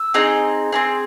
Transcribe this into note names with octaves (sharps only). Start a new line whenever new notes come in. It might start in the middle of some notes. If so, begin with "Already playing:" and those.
Already playing: E6
C4 D#4 G#4
C4 D#4 G#4